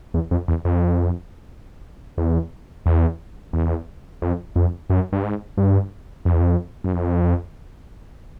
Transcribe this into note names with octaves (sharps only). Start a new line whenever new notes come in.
E2
F2
E2
F2
E2
E2
E2
F2
F2
F#2
G2
G#2
G2
F2
E2
F2
F#2
F2